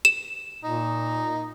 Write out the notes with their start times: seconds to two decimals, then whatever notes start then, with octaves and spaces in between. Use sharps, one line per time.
0.05 E7
0.64 A#2 D#4